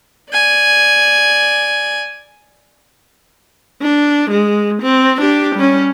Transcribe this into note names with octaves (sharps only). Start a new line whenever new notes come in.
D5 G#5
D4
G#3
C4
D4 G4
G3 C#4